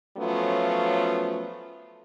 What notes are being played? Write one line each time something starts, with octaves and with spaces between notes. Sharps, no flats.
F3 F#3 A3 B3 C#4 F4